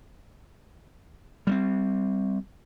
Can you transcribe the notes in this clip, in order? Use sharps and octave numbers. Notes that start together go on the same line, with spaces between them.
G3 A3 C4